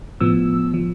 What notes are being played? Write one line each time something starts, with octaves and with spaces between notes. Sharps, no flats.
A2 F3 B3 E6
F3